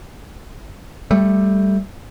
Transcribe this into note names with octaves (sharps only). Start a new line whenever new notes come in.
G3 A3